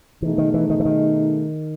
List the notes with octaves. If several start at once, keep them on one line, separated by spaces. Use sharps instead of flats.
B2 E3 A3 D#4 G#4
D#3
E3
D#3
E3
D#3